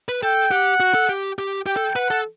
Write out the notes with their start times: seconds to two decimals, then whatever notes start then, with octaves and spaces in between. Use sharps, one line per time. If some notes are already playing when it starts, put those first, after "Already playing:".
0.09 B4
0.23 A4 G5
0.51 G4 F#5
0.80 F#4
0.94 A4
1.09 G4
1.39 G4
1.66 G4 G5
1.77 A4
1.96 B4 F#5
2.10 A4